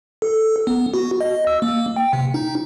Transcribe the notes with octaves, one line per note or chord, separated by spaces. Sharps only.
A4
B3
F#4
D#5
E6
A#3
G5
C3
D#4